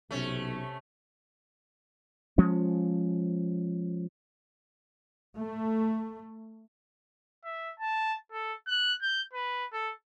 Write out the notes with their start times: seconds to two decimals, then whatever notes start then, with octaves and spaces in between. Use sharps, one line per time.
0.11 B1 C3 A3 C#4
2.38 F3 G#3 C#4
5.36 A3
7.45 E5
7.80 A5
8.32 A4
8.68 F#6
9.02 G6
9.33 B4
9.73 A4